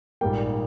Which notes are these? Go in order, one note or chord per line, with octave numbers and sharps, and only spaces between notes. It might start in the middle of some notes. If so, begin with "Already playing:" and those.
A#1 G#2 G3 A#3 G5